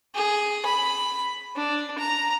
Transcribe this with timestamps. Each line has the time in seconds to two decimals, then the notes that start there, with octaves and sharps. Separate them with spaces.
0.15 G#4
0.65 B5
1.56 D4
1.98 A#5